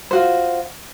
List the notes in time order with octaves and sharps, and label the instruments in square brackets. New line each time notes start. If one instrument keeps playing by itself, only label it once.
[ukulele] F4 F#4 C5